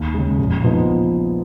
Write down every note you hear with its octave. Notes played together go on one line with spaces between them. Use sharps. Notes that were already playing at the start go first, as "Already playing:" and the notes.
Already playing: D#2
C#3 G#3
A#1
A#2 F3 B3 D#4